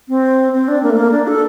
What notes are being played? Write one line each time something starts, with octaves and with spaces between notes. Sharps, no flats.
C4
C4
D4
A#3
A3
A#3
D4
A4